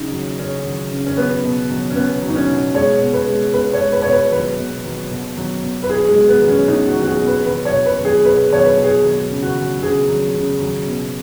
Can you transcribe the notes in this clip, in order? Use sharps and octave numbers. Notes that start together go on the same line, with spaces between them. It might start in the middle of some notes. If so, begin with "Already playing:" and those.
Already playing: C#3 F#3 D#4
F#3
C#3 C#4
F#3
C#3
C#4
F#3 B3
B2
F#3
C#4
B2 B3
F#3
D#4
C#4
B2
G#3 C#5
B2
B4
G#3
B2 B4
C#5
G#3
B4
B2 C#5
B4
F#3 B4
B2
F#3
B2
F#3
B2
B4
F#3 G#4
G#3
B2
B3
F#3
C#4
B2 D#4
F#4
F#3
F#4
G#4
B2
B4
F#3 B4
C#5
B2
B4
F#3
G#4
B2 B4
F#3 C#5
B4
B2
G#4
F#3
C#3
F#4
F#3
C#3 G#4
F#3
C#3
F#3
B2